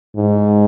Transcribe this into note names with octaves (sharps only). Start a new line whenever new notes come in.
G#2